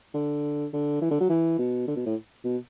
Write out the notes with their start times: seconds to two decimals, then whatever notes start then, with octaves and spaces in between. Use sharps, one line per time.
0.14 D3
0.73 D3
1.02 E3
1.11 D3
1.20 F#3
1.30 E3
1.59 B2
1.88 D3
1.97 B2
2.06 A2
2.44 B2